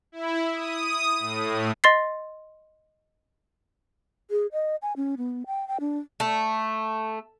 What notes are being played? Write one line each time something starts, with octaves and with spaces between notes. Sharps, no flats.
E4
D#6
A2
D#5 C6 A6 C7
G#4
D#5
G#5
C#4
B3
G5
G5
D4
A3